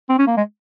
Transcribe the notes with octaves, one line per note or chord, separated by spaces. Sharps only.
C4
C#4
A#3
G#3